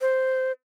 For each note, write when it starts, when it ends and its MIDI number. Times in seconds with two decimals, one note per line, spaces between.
0.01 0.52 72